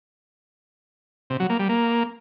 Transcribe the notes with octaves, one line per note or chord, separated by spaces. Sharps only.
C3
F#3
A#3
G3
A#3